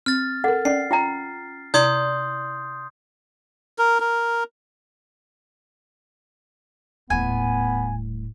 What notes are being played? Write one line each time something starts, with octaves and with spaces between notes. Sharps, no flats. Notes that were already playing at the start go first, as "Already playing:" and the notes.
C4 F6 A6
A4 A#4 F#5
C#4 D5 C7
F4 G5 A#5
C3 E4 D5 C6 D#6 G6
A#4
A#4
D#1 A2 B3 G#5